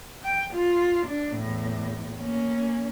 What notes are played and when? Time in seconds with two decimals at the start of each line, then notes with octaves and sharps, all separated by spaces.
0.24 G5
0.54 F4
1.06 D4
1.36 E2 A2
2.20 A#3 C#4